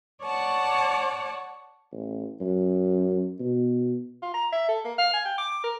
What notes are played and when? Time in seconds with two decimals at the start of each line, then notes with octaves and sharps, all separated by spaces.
0.22 C#5 D5 F#5 A5
1.92 A1
2.41 F#2
3.40 B2
4.22 F4
4.34 A#5
4.52 E5
4.68 A4
4.85 A#3
4.98 F5
5.13 G#5
5.25 G5
5.38 D6
5.64 A#4